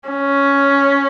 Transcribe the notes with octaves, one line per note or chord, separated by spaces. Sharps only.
C#4